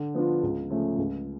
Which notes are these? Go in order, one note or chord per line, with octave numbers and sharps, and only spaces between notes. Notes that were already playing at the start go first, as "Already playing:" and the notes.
Already playing: D3
F3 B3 D4 F4
C#2
C#3 F3 A3 C#4
C#2